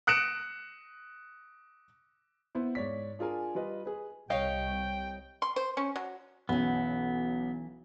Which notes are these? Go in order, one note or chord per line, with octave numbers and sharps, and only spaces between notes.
D#6 F#6 C#7 D7 E7
B3 E4 C5
G#2 C#5 D5 B6
D4 F4 G#4 A#4 G#5
G3 F4 B4 D#5
G#4 B4
C2 D#4 G4 C#5 D#5 F5 G5
C6
C5
C#4
F#3
B1 E3 B3 C#4 F#5